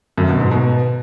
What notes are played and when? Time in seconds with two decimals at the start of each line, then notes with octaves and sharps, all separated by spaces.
0.18 F#2
0.29 B2
0.40 G#2
0.51 B2